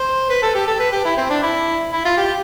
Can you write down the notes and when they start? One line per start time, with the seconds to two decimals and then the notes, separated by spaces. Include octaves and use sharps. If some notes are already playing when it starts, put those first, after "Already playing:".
Already playing: C5
0.30 B4
0.42 A4
0.55 G4
0.67 A4
0.80 B4
0.92 G4
1.05 E4
1.17 C4
1.30 D4
1.43 E4
1.93 E4
2.05 F4
2.17 G4